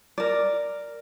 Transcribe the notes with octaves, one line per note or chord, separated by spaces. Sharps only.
A#4 D5